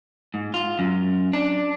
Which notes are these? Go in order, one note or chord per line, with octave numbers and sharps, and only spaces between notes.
G#2
F4
F#2
D4